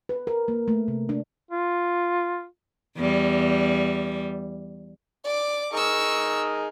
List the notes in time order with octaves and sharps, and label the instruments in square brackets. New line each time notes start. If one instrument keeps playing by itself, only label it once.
[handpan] B4
A#4
A#3
A3
C3
D4
[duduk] F4
[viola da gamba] E2 G3
[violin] D5 D6
[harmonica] D#4 G#4 A#4 [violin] C#6 E6